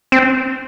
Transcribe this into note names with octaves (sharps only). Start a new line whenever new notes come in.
C4